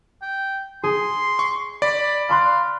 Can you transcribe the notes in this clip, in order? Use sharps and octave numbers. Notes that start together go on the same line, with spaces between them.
G5
G#4 C6
C#6
D5 B5
F5 B5 C6 F#6